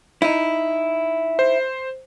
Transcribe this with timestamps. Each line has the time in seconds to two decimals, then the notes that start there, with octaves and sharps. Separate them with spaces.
0.22 D#4 E4
1.39 C5